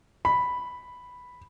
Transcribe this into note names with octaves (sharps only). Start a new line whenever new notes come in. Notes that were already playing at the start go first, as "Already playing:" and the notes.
B5